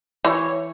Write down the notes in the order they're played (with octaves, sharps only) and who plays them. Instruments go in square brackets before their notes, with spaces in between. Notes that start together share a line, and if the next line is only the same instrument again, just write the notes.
[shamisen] E3 [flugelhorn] C#5